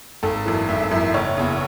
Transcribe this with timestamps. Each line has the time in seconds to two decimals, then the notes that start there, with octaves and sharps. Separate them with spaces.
0.23 G#1 A4
0.46 F#2 E3
0.69 G#1 E5
0.83 E5
0.91 F#2 E3
1.14 F#1 C#5
1.37 E2 C#3